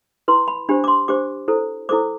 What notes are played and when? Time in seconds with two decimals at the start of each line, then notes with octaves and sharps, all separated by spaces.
0.28 E4 B4 C6
0.48 B5
0.69 D4 G4 C5 B5
0.84 D6
0.88 C6
1.08 D4 G4 C5 D6
1.48 E4 A4 C5
1.89 E4 A4 C5 D6